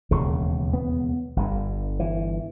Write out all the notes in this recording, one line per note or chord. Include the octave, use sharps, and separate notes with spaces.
E1 D#2 C#3
B3
G1 G2
E3